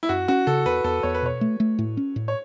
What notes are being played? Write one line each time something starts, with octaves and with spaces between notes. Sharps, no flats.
E4
F#2 F#4
C#4 F#4
C#3 A4
E2 B4
E2 A4
E2 C#5
B4
B2 C#5
A3
A3
A2
C#4
A2
C#5